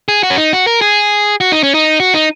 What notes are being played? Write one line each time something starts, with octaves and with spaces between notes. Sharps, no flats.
G#4
F#4
C#4
D#4
F#4
A#4
G#4
F#4
D#4
C#4
D#4
F#4
D#4